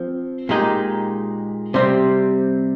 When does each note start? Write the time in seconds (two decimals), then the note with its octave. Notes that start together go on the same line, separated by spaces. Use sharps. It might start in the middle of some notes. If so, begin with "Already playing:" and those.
Already playing: F3 C4
0.49 A#2 G#3 D#4 G4
1.74 C3 G3 C4